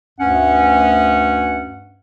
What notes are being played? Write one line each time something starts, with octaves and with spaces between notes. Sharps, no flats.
D2 G2 C#4 F#5